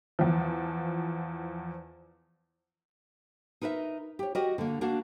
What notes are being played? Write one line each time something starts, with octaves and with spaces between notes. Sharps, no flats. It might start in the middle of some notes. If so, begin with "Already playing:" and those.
E2 F3
D#4 A#4 B4 D#5 E5
G4 C#5
F#4 G4 A#4 D#5
D3 A#3
A#3 D4 F#4 A#4